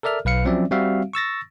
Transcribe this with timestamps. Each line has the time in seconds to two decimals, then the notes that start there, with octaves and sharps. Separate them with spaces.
0.03 A4 A#4 D5 E5 F6
0.25 B1 B4 F5 C#7
0.45 F3 F#3 C4 C#4 D5 E5
0.71 G3 C4 F#4 E5 F5
1.13 C#6 E6 A6 A#6